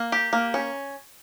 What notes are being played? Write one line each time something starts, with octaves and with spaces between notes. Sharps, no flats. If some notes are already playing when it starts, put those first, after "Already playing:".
Already playing: A#3
G4
A#3
C#4